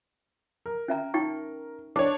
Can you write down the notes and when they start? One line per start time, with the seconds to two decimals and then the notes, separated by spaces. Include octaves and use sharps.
0.66 A#4
0.88 C#4 E5 A#5
1.14 D#4 G5 C#6
1.96 D4 C#5 D6